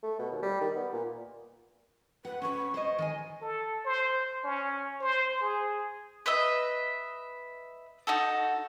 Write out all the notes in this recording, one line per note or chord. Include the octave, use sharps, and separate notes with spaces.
A3
B2
D#2
G3
D#3
B3
A#2
B4 F#5
C#4 B4 C#6
C5 C#5 D#5
D#3 D#5 G#5
A4
C5
C#4
C5
G#4
B4 D#5 E5
D#4 F#4 A4